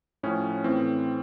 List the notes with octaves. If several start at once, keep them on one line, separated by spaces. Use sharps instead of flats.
A2 F3 C#4
A2 E3 C4